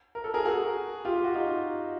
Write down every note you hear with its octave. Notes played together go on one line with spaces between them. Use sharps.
A#4
A4
G#4 A#4
F#4 G#4
F4 G4
F#4
D#4 F4